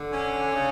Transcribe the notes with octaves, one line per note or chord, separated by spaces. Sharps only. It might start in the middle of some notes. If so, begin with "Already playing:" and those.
Already playing: D3
C#4
C#3